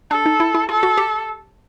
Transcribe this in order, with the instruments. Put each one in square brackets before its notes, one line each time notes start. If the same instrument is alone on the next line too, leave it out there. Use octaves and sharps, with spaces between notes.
[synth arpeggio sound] D4 [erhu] A4
[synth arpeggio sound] D#4
E4
E4
[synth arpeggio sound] F4 [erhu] A4
[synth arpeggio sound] F#4
G4